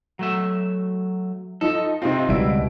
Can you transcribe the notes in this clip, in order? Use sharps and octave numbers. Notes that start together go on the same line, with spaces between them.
F#3 A3 E5
F3 D#4 A4
C3 C4 D#4 F4
C#2 B2 G3 E4 D7